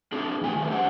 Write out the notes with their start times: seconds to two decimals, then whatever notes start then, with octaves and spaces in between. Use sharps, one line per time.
0.12 C4 D4 G#4 A4
0.41 E2 A2 G4 G#5
0.56 D#3 F#3 A3
0.70 D4 G4 G#4 C5 F#5